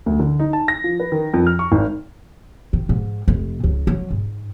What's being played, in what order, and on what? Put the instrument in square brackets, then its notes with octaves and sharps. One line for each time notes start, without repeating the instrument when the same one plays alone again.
[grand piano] D2
D3
D#4
A5
A#6
F3
B4
D#3
F2
F6
C#6
G#1
[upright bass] D#3
G#2
F1
C#2
F#3
G#2